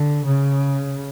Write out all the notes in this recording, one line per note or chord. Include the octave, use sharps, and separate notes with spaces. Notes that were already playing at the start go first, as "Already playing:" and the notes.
Already playing: D3
C#3